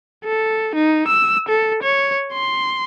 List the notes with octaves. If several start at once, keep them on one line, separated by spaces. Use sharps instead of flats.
A4
D#4
E6
A4
C#5
C6